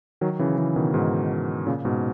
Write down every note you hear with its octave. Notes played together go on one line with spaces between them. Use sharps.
D#3 F#3
C#3 E3
C#3 E3
B2 D#3
G#2 B2
A#2 C#3
G#2 B2